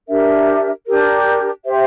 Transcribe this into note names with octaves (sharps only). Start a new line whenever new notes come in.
D4 G4 A#4 E5
D4 G4 A#4
G4 C5 E5 G5